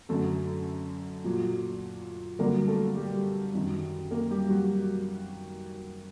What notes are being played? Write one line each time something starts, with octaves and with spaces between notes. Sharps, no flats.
F#2 D3 F#3 A3 A4
A#2 F#3
G2 D3 F#3 A#3 A#4
A3 A4
G3 G4
F#2 D#3 F#3
A#3 A#4
G3 G4
F#3 F#4